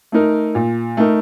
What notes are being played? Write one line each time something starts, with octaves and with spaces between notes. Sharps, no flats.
A3 D#4 A#4
A#2
A3 D#4 A#4